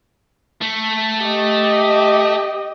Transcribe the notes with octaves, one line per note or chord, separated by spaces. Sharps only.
A3
G4 D#5